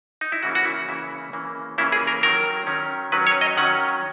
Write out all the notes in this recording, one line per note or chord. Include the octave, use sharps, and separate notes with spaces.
D#4
E4
C#3 E3 A#3 C#4 F#4
F#4
E4
C#3 E3 A#3 C#4 E4
C#3 E3 A#3 C#4
C#3 E3 A#3 C#4 E4
G#4
A#4
D#3 F#3 C#4 A#4
D#3 F#3 C#4
D#3 F#3 C#4 B4
C#5
D#5
D#3 F#3 C#4 F#5